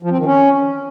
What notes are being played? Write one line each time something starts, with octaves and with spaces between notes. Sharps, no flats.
F3
C4
D#3
C#4